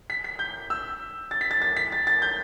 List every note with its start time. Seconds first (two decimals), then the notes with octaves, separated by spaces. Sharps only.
0.10 B6
0.24 B6
0.39 G6
0.70 E6
1.31 A6
1.41 B6
1.51 A6
1.62 A6
1.77 B6
1.92 A6
2.07 A6
2.22 G6